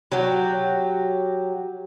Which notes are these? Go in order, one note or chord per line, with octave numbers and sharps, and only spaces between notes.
F#3 F#4 G4